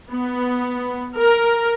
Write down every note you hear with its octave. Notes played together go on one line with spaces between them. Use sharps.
B3
A#4